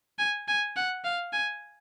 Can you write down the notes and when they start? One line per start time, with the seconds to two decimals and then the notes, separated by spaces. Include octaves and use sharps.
0.19 G#5
0.48 G#5
0.76 F#5
1.05 F5
1.33 G#5